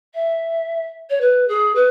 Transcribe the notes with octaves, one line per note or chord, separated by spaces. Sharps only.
E5
C#5
B4
G#4
B4